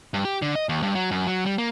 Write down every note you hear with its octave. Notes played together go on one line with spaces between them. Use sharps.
G2
G4
D3
D#5
D#2
G2
F#3
F#2
F#3
G3
A#3